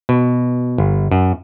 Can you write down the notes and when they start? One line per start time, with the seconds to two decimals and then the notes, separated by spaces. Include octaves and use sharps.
0.09 B2
0.78 G1
1.11 F#2